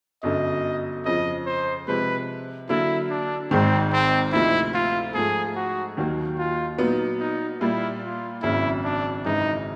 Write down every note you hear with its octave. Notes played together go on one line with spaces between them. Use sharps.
G1 F#2 D3 F#3 D#5
F2 C#3 F3 D#5
C5
C3 F3 G#3 B4
D3 F#3 A#3 E4
D4
G#1 G#2 D#3 C4
C4
D2 C3 F3 A#3 D#4 E4
F4
G#2 F3 A3 G#4
F#4
D#2 D#3 F#3 A#3
F4
A#2 F#3 B3 D#4
D#4
A#2 G3 A#3 E4
F4
G#1 F#2 C#3 F#3 A#3 E4
D4
G#1 F#2 C#3 E3 G#3 D#4